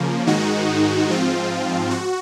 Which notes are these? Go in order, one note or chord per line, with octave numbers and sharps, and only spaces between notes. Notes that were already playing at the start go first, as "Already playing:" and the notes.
Already playing: C#3 F3 A#3
G#2 D#3 G#3 D#4 F#4
G#2 F3 C4 F4
F#4